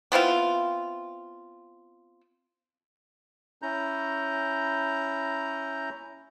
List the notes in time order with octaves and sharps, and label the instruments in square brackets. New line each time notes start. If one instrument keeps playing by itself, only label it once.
[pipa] B3 C4 E4 F4
[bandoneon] C#4 E4 A#5 G6